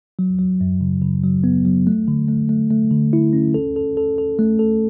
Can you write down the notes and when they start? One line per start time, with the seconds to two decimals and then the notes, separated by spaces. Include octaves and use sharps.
0.19 F#3
0.39 F#3
0.61 F#2
0.81 C#3
1.02 C#3
1.24 F#3
1.44 B3
1.65 F#3
1.87 A3
2.08 D3
2.28 A3
2.49 A3
2.71 A3
2.91 D3
3.13 E4
3.33 C#4
3.54 A4
3.76 A4
3.97 A4
4.18 A4
4.39 A3
4.59 A4